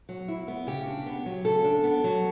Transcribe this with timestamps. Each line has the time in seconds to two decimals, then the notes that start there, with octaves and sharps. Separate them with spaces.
0.09 F#3
0.28 E4
0.48 B3
0.67 C#3 G4
0.87 D4
1.06 B3
1.26 F#3
1.45 C#3 A4
1.64 D4
1.84 B3
2.04 F#3